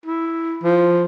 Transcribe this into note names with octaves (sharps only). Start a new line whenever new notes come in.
E4
F3